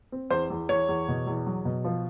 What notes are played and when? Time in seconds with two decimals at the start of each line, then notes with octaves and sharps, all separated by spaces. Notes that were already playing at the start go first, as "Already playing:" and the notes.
0.12 C4
0.30 E2 C5
0.50 E2
0.69 E2 C#5
0.89 E2
1.08 B2
1.27 E2
1.47 F#3
1.65 B2
1.84 F3